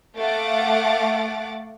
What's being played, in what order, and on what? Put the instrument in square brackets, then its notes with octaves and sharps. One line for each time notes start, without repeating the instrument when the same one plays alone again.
[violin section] A3 F5 F#5 D6 A6